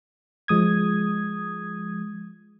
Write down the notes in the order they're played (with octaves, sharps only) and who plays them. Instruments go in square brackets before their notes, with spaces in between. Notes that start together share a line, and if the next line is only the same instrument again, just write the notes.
[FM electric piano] F3 G#3 D#6 G#6